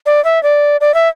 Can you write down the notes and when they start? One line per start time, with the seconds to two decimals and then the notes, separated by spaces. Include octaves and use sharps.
0.06 D5
0.25 E5
0.43 D5
0.81 D5
0.94 E5